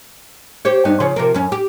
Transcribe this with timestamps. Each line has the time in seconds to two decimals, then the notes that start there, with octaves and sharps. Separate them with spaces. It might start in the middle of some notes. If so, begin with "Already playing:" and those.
0.65 G4 C5 C#5
0.85 G2 B3 D#4
1.00 C#3 F3 C#5
1.16 C3 F3 A#4
1.34 F#2 C#4
1.52 G4